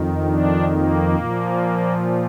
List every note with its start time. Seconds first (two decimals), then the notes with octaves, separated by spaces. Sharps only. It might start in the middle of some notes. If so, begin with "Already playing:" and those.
Already playing: F2 D#3
0.24 D4
0.69 A#3
1.16 A#2 F3